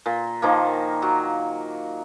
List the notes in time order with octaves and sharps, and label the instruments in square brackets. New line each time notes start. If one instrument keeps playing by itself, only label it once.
[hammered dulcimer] A#2
D#3 F3 A#3
F#3